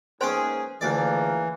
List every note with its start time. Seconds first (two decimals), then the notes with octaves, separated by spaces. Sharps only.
0.21 G#2 A#3 C#4 G#4 B4 C5 G5 C6
0.81 D2 C#3 E3 F3 A#3 D5